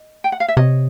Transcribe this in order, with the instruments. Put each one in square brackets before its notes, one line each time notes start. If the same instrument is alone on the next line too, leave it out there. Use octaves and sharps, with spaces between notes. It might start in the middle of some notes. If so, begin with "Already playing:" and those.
Already playing: [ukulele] D#5
G5
F#5
F5
E5
[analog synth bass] C3 [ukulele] C#5 D#5